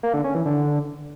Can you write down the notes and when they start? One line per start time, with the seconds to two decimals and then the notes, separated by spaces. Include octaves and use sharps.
0.03 A#3
0.14 D3
0.24 C#4
0.35 E3
0.45 D3